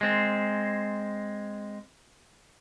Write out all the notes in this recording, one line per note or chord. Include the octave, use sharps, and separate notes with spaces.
G#3 C4